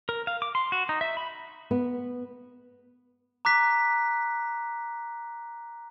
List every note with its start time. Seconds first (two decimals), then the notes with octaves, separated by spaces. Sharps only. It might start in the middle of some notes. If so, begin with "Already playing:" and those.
0.09 A#4
0.27 F5
0.42 D6
0.55 C6
0.72 F#4
0.89 D#4
1.01 E5
1.17 B5
1.71 B3
3.45 A#5 D6 F#6 B6